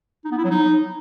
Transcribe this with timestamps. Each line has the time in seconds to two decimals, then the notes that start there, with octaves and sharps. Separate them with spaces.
0.25 D#4
0.31 B3
0.38 E4
0.44 F#3
0.51 D#4